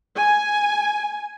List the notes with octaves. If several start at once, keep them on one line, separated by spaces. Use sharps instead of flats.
G#5